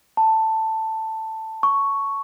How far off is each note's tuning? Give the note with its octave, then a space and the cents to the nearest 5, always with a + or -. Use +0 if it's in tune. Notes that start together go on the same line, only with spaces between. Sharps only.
A5 +10
C#6 +5